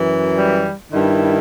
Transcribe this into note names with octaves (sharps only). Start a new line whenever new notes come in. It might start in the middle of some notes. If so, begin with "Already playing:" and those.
Already playing: F#2 E3
G3
G2 D#3 E4